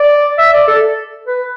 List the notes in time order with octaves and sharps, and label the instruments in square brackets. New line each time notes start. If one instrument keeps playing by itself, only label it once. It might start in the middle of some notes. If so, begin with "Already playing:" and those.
Already playing: [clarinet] D5
E5
D5
A4
B4